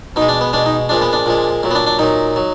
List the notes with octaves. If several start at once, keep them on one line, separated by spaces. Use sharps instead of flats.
B2 D#4
G#3
D4
B3
B2 G#3 D4
D#4
A#2 F3 G#3 D4
B3
D4
A#2 F3 G#3
A#2 F#3
B3
D4
D4
A#2 F#3 D#4
F#3